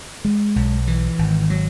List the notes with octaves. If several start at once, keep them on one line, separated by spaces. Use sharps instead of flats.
G#3
B1
E3
G#1
F#3